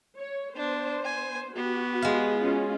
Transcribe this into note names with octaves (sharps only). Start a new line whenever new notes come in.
C#5
B3 D4 C5
G#5
B3 F#4 G4
G#3 F5
C#4 F4 F#4